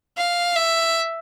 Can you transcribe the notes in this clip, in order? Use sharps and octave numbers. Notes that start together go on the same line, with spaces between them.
F5
E5